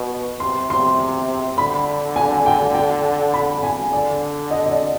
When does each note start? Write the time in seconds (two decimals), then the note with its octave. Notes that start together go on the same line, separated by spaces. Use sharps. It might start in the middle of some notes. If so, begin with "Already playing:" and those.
Already playing: B2
0.40 C3 C6
0.70 C3 C6
1.58 D3 B5
2.16 G#5
2.46 G5
2.75 G5
3.34 B5
3.63 G#5
3.92 D3 D5
4.51 D#5
4.66 D#5
4.71 D5